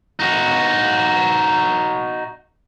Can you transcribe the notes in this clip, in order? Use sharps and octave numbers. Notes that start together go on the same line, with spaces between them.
D#4 F#4